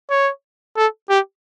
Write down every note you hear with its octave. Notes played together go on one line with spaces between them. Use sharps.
C#5
A4
G4